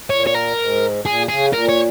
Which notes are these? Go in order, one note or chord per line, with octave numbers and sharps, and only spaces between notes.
A#2 C#5
C#5
A#4
G#2
A#2 G#4
C#3 G#4
A#2 A#4
C#5